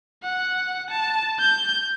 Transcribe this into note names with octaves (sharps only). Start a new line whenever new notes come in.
F#5
A5
G6